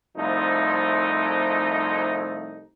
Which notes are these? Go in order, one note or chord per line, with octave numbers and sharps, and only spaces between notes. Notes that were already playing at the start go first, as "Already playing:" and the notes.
C2 F3 A3 C4 D#4